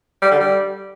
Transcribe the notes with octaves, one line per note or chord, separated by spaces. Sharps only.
G3
D3
G3